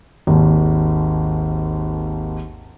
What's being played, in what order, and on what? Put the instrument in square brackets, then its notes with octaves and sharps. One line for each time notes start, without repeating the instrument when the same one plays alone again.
[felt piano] G#1 D#2